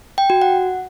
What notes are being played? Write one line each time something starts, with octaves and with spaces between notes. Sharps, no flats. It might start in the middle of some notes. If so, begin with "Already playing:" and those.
G5
F#4
F#5